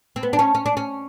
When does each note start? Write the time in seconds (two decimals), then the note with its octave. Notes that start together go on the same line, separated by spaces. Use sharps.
0.16 C4
0.23 B3
0.33 D4
0.39 C#4
0.55 C#4
0.66 D4
0.77 C#4